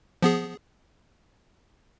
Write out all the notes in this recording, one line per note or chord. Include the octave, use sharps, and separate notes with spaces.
F3 B3 G#4